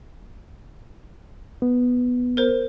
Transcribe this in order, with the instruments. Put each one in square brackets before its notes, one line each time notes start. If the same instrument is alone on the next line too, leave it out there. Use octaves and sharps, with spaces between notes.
[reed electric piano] B3
[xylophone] A#4 C5